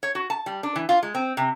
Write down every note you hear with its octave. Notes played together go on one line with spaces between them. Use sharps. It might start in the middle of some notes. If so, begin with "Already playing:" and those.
C#5
F#4
A5
G3
D4
E3
F4
G#3
C4
C3